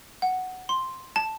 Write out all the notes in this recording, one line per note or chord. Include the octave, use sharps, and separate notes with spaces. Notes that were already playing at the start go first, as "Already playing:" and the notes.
F#5
C6
A5